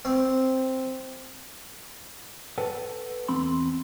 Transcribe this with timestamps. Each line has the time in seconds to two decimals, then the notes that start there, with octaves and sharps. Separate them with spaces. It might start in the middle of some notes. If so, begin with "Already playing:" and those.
0.05 C4
2.58 A4 B4 F#5 A5
3.28 E2 C4 B5 C6